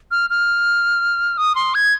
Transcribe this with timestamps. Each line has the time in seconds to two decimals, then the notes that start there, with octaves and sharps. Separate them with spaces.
0.11 F6
0.30 F6
1.38 D#6
1.55 C6
1.75 G#6